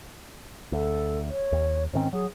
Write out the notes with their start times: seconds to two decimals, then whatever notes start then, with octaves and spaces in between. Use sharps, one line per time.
0.72 D2 A4
1.29 C#5
1.52 D#2
1.93 G#2 D#3 C4 C#4
2.13 F#3 G#4